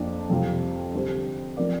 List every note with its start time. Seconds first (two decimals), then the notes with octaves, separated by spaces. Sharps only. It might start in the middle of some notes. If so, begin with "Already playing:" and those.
Already playing: F2 F3 A#3 D4
0.30 F2 C3 G3 C4 F4
0.93 D3 G3 C4 G4 C5
1.57 F3 C4 A#4 D5